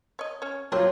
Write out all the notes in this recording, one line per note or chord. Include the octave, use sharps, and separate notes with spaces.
C#5 D#5
C#4 C#5
F#3 C4 F4 G4 A#4 C#5